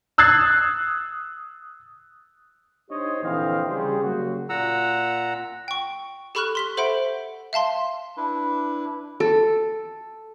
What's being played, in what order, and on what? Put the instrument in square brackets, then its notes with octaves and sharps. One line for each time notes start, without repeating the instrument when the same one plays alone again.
[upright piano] D#6 E6 F#6 G#6 A6 C7
[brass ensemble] D4 D#4 G4 C5 C#5 D#5
A#1 D3 E3 C4 D#5 F5
C#3 G3 G4 G#4 C5 C#5
C#3 F#3 A#3 F#4
[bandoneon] A#2 F#5 A#5 E6
[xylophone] G5 C#6
G4 A4 B5 C#6 F6 F#6
C6 B6 G7
A4 C5 E5 F#5 B5 D7
E5 F5 A5 C6
[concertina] D4 E4 B4
[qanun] A4